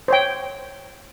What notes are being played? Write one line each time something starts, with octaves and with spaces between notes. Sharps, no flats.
C5 C#5 G5